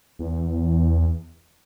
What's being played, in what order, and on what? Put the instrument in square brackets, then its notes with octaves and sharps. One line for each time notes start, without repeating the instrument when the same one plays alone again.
[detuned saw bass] E2